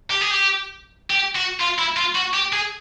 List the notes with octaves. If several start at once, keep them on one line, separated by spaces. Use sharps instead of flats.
G4
G#4
G4
G4
F#4
F4
E4
F4
F#4
G4
G#4